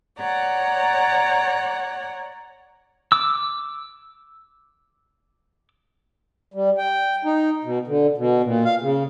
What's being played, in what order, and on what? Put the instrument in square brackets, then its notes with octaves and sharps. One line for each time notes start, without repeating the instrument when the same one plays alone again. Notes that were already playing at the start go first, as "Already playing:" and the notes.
[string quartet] C#5 D5 F#5 A#5
[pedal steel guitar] D6 E6
[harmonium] G3
G5
D#4
B2
D3
B2
A#2
F5
C#3